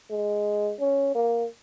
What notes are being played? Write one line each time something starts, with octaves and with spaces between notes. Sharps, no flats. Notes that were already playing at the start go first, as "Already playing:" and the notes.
G#3
C#4
A#3